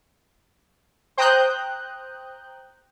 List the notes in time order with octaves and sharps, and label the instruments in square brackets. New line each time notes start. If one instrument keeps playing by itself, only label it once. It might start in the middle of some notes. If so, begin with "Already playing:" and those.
[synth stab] C5 G5 A#5 D#6 F#6 G6